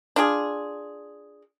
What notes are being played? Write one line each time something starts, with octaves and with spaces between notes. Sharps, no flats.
D4 F4 G#4